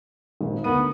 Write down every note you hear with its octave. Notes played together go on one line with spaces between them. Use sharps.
G#1 A#2
D2 B3 A#4 D#7